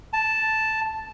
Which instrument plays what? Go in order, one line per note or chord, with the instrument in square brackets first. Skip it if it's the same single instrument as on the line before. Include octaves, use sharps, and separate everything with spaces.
[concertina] A5